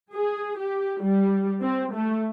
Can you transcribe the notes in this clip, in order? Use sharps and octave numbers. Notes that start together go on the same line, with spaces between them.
G#4
G4
G3
C4
A3